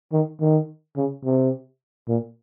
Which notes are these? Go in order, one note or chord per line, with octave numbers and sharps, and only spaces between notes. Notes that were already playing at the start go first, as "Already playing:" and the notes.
D#3
D#3
C#3
C3
A#2